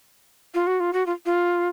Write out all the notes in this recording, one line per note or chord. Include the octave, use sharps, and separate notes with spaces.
F4
F#4
F4
F#4
F4
F4